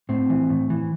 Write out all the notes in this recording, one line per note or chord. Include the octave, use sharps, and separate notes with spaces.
A2 C4
E3
A2
E3